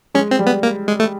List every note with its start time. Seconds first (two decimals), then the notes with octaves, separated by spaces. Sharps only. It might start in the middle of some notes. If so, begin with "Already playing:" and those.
0.14 G#3 C#4
0.31 C4
0.39 G3
0.46 B3
0.63 A#3
0.88 G#3
1.00 A3